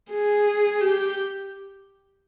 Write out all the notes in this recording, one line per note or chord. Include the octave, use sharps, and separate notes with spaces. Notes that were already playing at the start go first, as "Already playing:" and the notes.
G#4
G4